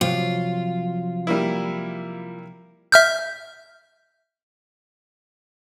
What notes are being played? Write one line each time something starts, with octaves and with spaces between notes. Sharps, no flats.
C3 F3 F#3 F4
G3 A#3 E4
E5 F6 G6